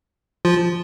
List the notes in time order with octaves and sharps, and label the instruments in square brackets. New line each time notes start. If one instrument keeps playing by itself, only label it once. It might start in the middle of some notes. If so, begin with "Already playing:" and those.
[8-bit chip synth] F3 F4